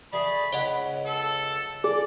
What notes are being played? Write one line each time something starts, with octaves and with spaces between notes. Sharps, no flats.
A3 G#4 D5 B5
C#2 C#5 D#5 F#5
A4
G#4 D5